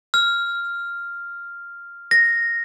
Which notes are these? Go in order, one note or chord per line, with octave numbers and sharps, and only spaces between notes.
F6
A#6